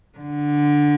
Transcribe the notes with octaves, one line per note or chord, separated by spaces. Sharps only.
D3